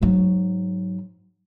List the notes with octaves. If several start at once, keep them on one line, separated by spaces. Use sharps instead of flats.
G#2 F#3